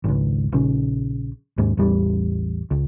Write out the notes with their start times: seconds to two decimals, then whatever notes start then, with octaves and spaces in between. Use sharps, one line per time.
0.04 G#1 C#2
0.52 A#1 C#3
1.58 D#2 G#2
1.77 A1 E2 G3
2.71 C#2